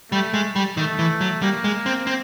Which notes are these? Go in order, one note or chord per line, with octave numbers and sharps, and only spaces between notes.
G3 A3
G#3
G3
D#3 A3
E3
F#3
G3 A#3
G#3
C4
C4